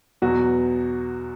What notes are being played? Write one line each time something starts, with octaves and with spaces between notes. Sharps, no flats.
E2 B2 F#3 F#4